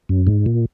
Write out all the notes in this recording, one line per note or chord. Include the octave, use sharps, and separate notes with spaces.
F#2
G#2
A#2